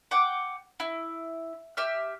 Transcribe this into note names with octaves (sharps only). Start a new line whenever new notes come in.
F#5 G5 D6
E4
G4 E5 F6